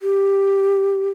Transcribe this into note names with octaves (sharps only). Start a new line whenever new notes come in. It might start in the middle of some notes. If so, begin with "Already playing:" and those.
G4